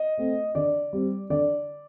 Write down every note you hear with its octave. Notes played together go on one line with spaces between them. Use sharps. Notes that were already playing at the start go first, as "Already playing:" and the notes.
Already playing: D#5
A3 C4
D3 D5
G3 C4
D3 D5